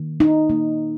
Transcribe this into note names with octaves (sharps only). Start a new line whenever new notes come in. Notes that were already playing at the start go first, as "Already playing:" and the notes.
Already playing: D#3 A#3
D#4
D#3 A#3